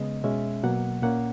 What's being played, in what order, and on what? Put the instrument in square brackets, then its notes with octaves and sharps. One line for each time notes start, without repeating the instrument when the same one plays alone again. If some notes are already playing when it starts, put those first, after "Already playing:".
Already playing: [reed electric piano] C#3 G#3 B3 D#5
B2 G#3 C#4 E5
B2 F#3 A#3 F#5
A#2 A#3 C#4 F#5